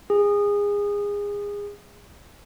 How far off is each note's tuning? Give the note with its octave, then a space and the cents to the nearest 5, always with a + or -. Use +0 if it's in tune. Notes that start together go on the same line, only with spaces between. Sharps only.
G#4 -25